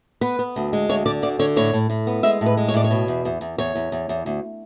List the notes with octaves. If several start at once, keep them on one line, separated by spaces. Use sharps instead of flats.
B3 B4
B3
D2
G#3
D2 C#5
D3 D5
D2 D5
D3 C#5
A2 C#5
A2
A2
B3
G#3 E5
A2
B4
G#3
C#5
A2 D5
C#5
B2
E2
E2
E2
E2 C#5
E2
E2
E2
D2